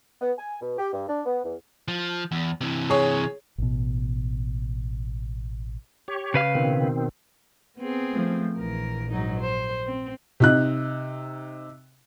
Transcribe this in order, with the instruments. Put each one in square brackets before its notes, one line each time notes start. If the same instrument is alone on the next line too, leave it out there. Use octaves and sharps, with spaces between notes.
[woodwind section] B3
G#5
B2
G4
G2
D4
B3
E2
[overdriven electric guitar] F3
E2
C3 E3
[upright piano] G#4 C#5
[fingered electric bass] A1 B2
[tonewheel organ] G4 C#5
[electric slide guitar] C#3 B4 F5
[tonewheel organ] B2 D#3 C4
[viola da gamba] B3 C4 G#4
[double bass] F3 A3
[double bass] A#1 [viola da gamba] E3 A#4
[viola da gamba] G#2 F#3 D#4
C5
C4
[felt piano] C3 D#4 F#6